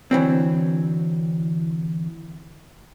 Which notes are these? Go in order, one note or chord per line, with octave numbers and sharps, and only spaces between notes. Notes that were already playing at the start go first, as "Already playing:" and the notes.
D3 E3 F#3 C4